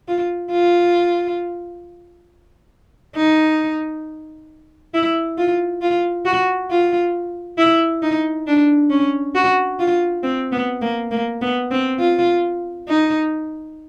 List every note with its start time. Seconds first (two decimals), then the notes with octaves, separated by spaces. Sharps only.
0.08 F4
0.52 F4
3.16 D#4
4.94 E4
5.38 F4
5.82 F4
6.25 F#4
6.71 F4
7.58 E4
8.02 D#4
8.47 D4
8.90 C#4
9.35 F#4
9.79 F4
10.23 C4
10.52 B3
10.82 A#3
11.11 A#3
11.42 B3
11.71 C4
11.99 F4
12.88 D#4